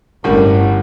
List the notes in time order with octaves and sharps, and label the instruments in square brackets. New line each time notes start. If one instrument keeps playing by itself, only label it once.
[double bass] G1 [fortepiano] A2 D3 G3 [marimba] C#4 A#4